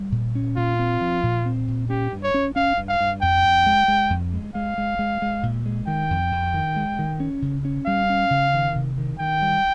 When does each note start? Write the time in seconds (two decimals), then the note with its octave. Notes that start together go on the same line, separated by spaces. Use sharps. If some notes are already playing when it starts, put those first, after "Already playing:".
Already playing: G3
0.12 A#2
0.35 C#4
0.57 A#2 F4
0.79 C4
1.01 F3
1.23 A#2
1.46 C4
1.68 A#2
1.90 C#4 G4
2.12 G2
2.23 C#5
2.34 C#4
2.56 C#4 F5
2.77 G2
2.89 F5
3.00 G2
3.22 F2 G5
3.45 F2
3.66 G#3
3.88 G#3
4.10 F2
4.33 G#3
4.55 G#3 F5
4.78 G#3
4.99 G#3
5.22 G#3
5.43 A#2
5.66 G#3
5.87 D#3 G5
6.10 F2
6.32 F2
6.54 D#3
6.76 G#3
6.99 D#3
7.20 C#4
7.42 C#3
7.65 C#4
7.86 G3 F5
8.10 C#4
8.31 C#3
8.54 D#3
8.75 C3
8.98 D#3
9.19 D#3 G5
9.42 G3